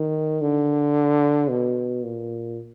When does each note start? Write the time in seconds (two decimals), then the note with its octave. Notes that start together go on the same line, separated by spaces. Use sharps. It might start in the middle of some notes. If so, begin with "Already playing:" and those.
Already playing: D#3
0.41 D3
1.49 B2
2.03 A#2